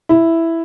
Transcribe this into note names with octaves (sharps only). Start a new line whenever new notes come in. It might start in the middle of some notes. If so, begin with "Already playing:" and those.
E4